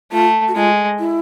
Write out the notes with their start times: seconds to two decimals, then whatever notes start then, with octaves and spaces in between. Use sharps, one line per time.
0.12 A3 F4
0.48 F#4
0.55 G#3 F4
0.99 E4